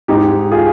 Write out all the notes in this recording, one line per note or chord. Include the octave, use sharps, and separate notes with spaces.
G#2 D#4 G4
F4 G#4